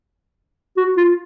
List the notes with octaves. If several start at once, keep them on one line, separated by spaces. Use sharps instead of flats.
F#4
F4